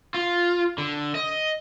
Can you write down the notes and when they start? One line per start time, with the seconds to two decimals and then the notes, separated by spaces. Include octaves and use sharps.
0.14 F4
0.78 D3
1.15 D#5